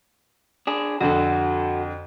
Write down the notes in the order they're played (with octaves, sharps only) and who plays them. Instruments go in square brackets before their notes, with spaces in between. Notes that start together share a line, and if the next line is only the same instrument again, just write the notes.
[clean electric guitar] D4 G#4
[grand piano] F2 D3 [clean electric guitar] F#4 A4